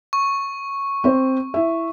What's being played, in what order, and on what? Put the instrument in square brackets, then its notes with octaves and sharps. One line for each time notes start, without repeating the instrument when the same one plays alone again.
[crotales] C#6
[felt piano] C4 C5
E4 E5